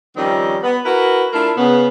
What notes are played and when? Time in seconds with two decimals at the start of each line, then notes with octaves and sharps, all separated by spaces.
0.16 D#3 F3 G3 C4 C#4 D#4
0.63 B3
0.84 E4 F#4 A#4 B4
1.33 A3 D4 E4 F4 A4 A#4
1.57 C#3 B3